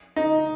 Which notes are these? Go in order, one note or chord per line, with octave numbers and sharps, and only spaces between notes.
D#4